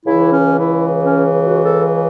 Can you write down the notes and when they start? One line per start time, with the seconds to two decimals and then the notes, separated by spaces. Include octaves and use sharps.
0.06 C#2 C#3 E3 E4
0.32 C#4
0.58 E4
1.04 C#4
1.44 F#4
1.64 A4